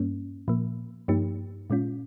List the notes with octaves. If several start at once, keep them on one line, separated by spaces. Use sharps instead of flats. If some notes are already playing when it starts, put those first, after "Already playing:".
Already playing: G2 G3 A#3 C#4
A#2 F3 A#3
G2 F3 A#3 D#4 G4
A#2 G#3 C#4 F4